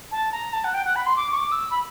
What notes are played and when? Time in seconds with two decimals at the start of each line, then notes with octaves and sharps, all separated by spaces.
0.12 A5
0.32 A#5
0.53 A5
0.64 F#5
0.74 G5
0.85 F#5
0.96 B5
1.06 C6
1.17 D6
1.32 C#6
1.37 D6
1.52 E6
1.71 B5